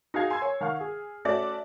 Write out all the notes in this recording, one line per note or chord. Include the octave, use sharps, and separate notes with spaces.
D#4 F#4 G#4 F5 G#6 C7
G#5 C6 E6 G#6
C#5
D#3 F5 F#5 C#6 F6
G#4
A3 C#4 F#4 A4 D5 E5